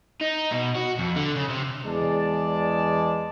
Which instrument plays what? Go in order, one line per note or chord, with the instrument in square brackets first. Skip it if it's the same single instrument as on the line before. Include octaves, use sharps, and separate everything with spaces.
[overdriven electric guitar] D#4
B2
F#4
F2
D3
C#3
C3
[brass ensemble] E2 G#3 G#4 D5 A5